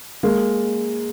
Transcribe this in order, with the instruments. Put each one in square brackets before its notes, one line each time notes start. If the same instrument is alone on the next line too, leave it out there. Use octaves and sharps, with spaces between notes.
[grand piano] G#3 A#3